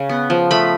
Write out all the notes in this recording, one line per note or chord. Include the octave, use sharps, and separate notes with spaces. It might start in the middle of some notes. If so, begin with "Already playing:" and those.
Already playing: C#3
B3
F3
A3 B5